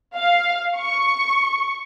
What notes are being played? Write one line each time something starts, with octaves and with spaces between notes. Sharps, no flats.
F5
C#6